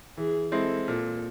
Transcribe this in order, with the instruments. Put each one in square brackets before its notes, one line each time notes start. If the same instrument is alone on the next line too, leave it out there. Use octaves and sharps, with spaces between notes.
[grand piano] E3 [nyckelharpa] G#4
[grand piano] G#3 C4 E4 [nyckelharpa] A4
[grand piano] A#2 [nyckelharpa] A4